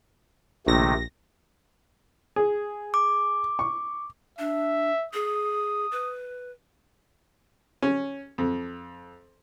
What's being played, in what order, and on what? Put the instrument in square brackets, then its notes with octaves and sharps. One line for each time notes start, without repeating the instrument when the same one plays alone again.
[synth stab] A#1 A#6 [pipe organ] C3 D#3 A3
[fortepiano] G#4
[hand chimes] D6
[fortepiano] C#6
[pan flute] D4 [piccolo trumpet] E5
[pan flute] G#4 [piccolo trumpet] D#6
[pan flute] B4
[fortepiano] C#4
F2